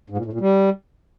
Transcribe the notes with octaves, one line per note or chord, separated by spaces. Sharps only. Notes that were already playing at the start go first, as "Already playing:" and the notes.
G#2
A#2
A2
A#2
G3